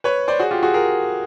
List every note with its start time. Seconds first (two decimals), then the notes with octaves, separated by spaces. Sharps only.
0.04 B4 C#5
0.28 C5 D5
0.39 F#4 G#4
0.51 F4 G4
0.63 F#4 G#4
0.74 G#4 A#4